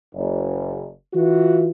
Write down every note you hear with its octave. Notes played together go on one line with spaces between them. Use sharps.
F#1
E3 F4 F#4